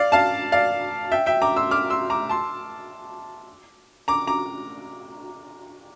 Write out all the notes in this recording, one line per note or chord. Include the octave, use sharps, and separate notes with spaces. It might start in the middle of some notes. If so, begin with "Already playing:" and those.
Already playing: D5 F5
F5 A5
D5 F5
E5 G5
E5 G5
A#5 D6
C6 E6
D6 F6
C6 E6
A#5 D6
A5 C6
A#5 D6
A#5 D6